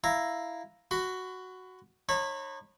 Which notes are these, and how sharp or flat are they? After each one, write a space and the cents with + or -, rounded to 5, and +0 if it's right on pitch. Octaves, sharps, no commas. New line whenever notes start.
E4 +0 F5 +0 A#5 +0
F#4 +5 B5 +35
D#4 -40 C#5 -30 B5 +0